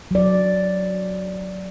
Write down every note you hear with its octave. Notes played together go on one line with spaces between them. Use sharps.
F#3 D5